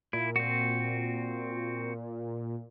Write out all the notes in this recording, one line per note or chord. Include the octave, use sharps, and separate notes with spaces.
A#2 E4
C4 F#4